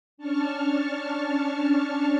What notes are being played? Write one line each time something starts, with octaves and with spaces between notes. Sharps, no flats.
C#4 D4 A5 C#6 F6